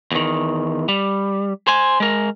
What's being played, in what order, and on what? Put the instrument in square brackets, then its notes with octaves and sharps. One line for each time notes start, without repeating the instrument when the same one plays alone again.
[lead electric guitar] E2 D#3
G3
C5 G#5
G#3 A#4